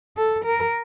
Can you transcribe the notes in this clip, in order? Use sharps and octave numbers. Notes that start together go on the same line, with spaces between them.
A4
A#4